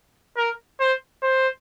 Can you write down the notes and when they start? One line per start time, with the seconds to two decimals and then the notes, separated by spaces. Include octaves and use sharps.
0.37 A#4
0.80 C5
1.22 C5